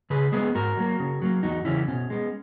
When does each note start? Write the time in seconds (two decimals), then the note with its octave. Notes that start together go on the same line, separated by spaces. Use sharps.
0.10 C#3 G#4 B4
0.32 G#3 B3 G#4 B4
0.55 G#2 F#4 A#4
0.77 F#3 A#3
1.00 C#3
1.22 F#3 A#3
1.43 E2 D#4 F#4
1.65 C#3 E3 C#4 E4
1.88 B2 C#4
2.10 G#3 B3